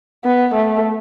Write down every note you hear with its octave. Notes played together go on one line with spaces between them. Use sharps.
B3
A3